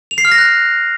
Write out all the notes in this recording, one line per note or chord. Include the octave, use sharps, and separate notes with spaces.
F7
C7
F6
A#6
F#6